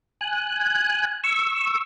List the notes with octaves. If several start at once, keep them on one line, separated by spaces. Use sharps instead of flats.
G#5 F#6
C#6 E6